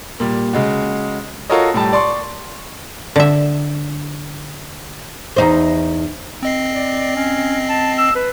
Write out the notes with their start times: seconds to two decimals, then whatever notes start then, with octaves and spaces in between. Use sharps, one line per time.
0.20 A#2 G3
0.53 C#3 G#3 F#4
1.50 F4 F#4 A4 A#4 C#5 D#5
1.74 A2 G3 A5
1.93 D5 C6 C#6
3.16 D3 E5
5.36 E2 D#4 C5
6.43 C4 D#5 C7
6.73 D5
7.16 C#4
7.69 A5
7.98 E6
8.16 B4